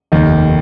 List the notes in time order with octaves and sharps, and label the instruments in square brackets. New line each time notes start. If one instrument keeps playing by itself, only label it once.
[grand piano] F1 D#2 D#3